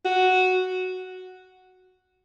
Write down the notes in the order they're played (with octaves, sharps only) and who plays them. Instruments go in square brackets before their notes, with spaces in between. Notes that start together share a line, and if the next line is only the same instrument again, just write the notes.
[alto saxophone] F#4